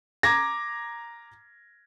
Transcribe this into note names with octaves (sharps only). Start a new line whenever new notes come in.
A#5 D6 G#6 A#6